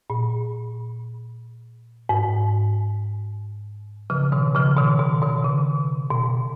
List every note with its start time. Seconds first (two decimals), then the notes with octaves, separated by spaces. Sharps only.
0.10 A#2
2.09 G#2
4.10 C#3 F3
4.32 B2 D#3
4.54 C#3 F3
4.77 B2 D#3
4.99 B2
5.22 B2 D#3
5.44 C#3
6.11 B2